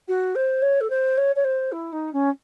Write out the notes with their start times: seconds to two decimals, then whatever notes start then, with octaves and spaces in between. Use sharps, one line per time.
0.08 F#4
0.35 C5
0.62 C#5
0.80 A4
0.90 C5
1.17 C#5
1.35 C#5
1.44 C5
1.72 E4
1.92 D#4
2.13 C#4